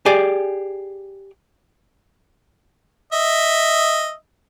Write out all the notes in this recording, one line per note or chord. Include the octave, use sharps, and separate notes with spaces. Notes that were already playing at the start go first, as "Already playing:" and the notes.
G4 G#4 D5 G#5
D#5 E5